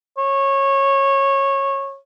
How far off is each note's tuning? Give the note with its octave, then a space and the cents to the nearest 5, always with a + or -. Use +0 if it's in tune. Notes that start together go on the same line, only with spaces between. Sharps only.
C#5 -20